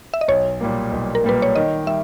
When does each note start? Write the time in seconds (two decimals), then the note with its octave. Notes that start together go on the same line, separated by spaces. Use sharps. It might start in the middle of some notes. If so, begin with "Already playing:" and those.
0.14 E5
0.21 D#5
0.28 B1 C#5
0.60 A#2 G3 A#3
0.92 B1
1.15 A#4
1.24 A#2 G3 A#3 B4
1.42 C#5
1.56 D#3 D#5
1.87 G3 E5